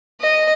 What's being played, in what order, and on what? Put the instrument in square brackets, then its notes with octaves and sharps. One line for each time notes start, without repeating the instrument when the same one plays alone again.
[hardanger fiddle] D#5